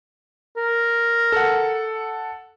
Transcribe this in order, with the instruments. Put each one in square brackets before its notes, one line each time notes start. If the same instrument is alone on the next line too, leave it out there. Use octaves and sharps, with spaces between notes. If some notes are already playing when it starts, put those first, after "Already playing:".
[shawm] A#4
[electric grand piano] A4 F#5